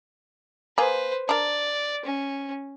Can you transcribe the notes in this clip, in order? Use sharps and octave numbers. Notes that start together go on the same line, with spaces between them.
A#3 G#4 B4 C5
D4 A#4 D5
C#4